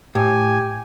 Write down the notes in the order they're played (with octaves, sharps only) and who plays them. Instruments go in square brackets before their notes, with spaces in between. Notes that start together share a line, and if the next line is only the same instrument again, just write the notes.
[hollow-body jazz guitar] A2 [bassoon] G4 [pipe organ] G#5